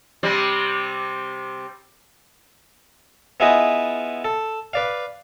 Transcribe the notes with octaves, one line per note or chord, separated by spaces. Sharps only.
C3 G3 C4
B3 E4 F4 G#4 B4 D#5
A4
B4 D5 F5